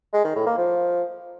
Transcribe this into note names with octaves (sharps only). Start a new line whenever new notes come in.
G#3
D#3
A2
A#3
F3